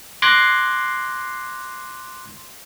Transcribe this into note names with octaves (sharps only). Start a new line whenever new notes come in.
C6 D6 F#6 G#6 A#6 C7